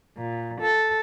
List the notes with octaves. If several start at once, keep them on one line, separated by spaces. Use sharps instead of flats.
A#2
A4